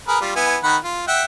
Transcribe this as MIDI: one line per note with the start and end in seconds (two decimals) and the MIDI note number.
0.08 0.18 68
0.08 0.18 70
0.08 0.18 71
0.21 0.32 55
0.21 0.32 65
0.36 0.56 59
0.36 0.56 64
0.36 0.56 80
0.63 0.77 51
0.63 0.77 78
0.63 0.77 83
0.84 1.07 65
1.08 1.24 76
1.08 1.24 78
1.08 1.24 79